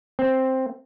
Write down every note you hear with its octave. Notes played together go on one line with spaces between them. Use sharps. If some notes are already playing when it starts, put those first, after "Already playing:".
C4